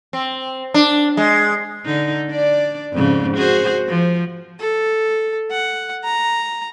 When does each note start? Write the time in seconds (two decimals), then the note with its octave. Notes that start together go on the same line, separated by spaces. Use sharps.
0.13 C4
0.74 D4
1.17 G#3
1.85 D3 D#4
2.30 D4 D5
2.93 F2 G#2 C#3
3.37 F#4 G#4 C5
3.89 F3
4.60 A4
5.51 F#5
6.04 A#5